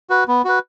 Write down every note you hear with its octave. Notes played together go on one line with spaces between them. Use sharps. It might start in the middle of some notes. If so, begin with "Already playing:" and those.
F#4 B4
B3
F#4 B4